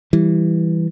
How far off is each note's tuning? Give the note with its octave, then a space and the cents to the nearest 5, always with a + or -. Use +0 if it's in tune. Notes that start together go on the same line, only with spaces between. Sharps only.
E3 +0 G3 +0